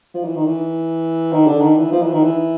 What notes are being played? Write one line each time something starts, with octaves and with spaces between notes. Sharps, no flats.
F3
E3
D#3
E3
D#3
D3
D#3
E3
F3
E3
D#3
E3